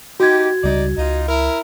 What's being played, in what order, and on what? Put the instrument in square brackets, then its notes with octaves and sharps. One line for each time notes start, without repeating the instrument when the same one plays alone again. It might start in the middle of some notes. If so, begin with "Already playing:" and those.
[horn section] D#4 G4 [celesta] F#4 G#6
[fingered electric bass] C#2 C#3 G3 [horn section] D#4 D5
[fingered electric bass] C#2 [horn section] D#4 F4
[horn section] E4 A#4